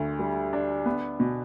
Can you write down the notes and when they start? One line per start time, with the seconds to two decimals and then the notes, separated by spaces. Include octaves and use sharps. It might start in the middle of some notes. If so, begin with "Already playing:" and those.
Already playing: D2 D3
0.19 G3
0.53 D4
0.86 B3
1.20 B2